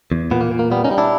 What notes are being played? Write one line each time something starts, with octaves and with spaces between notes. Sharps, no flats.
E2
A#2 B3
A#3
A#2
A#3
G3 B3
C#4 D#4
G3
D4 E4